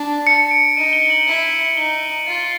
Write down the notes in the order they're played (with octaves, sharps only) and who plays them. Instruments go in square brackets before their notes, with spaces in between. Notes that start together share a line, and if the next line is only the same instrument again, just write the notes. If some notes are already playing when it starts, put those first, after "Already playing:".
Already playing: [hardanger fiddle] D4
[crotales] C#7
D7
[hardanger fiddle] D#4 [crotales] D#7
[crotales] G7
F#7
[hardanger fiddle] E4
[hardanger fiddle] D#4 [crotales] G7
[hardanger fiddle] F4